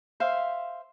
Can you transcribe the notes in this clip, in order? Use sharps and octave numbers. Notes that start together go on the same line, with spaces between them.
C5 E5 F5